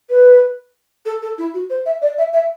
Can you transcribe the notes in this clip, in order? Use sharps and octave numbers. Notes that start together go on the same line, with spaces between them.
B4
A4
A4
E4
F#4
C5
E5
D5
E5
E5